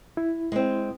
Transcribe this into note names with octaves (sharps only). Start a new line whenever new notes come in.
E4
G#3 C4